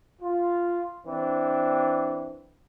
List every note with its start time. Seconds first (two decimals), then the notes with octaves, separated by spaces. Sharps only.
0.21 F4
1.05 E3 C4 D4